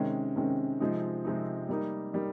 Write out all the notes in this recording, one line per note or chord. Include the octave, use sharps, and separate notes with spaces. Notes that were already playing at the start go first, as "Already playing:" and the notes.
Already playing: C3 D#3 G#3 C#4
C3 D#3 G#3 C#4
C3 F3 G#3 C4 D#4
C3 F3 G#3 C4 D#4
G3 A#3 D#4
G3 A#3 D#4